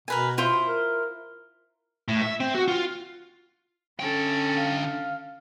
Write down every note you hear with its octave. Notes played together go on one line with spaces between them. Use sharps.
B2 A#4 B4 G#5
E4 F4 C5
A#4
A2
E5
C4
F#4
F4
D3 C#4 A4 G5
F5